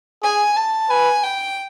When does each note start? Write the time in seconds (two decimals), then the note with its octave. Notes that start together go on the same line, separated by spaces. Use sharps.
0.23 G#4 G#5
0.56 A5
0.90 B4 G#5
1.23 G5